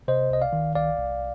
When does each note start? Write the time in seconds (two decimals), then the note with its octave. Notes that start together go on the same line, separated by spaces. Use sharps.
0.08 C3 C5 D#5
0.30 C2 D#5
0.41 D5 F5
0.53 D#3
0.75 C2 D5 F5
0.98 C2